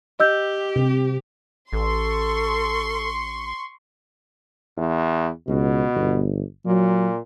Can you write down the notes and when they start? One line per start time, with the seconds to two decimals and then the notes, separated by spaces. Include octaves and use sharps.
0.20 G4 D#5 E6 G6
0.76 C3
1.73 A1 A4 C6 C#6
4.78 E2
5.48 C#2 B2
5.95 G1
6.66 A#2 F#3